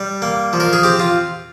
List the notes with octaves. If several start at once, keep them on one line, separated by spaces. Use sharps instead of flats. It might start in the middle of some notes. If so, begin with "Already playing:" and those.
Already playing: G3
A#3
F3
A#4
G#4
C4 G4
F4